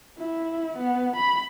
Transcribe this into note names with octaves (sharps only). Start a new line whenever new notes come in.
E4
B3
B5